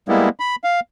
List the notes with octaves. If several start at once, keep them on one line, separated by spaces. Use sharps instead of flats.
G3 G#3 A#3 B3 E4
B5
F5